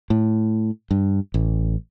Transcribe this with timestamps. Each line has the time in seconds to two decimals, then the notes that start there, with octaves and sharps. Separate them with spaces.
0.10 A2
0.91 G2
1.34 A1